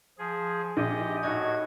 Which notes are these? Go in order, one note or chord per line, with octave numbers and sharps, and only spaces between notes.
F3 G#4
A#1 G4 D#5
A2 D#4 F#4 G#6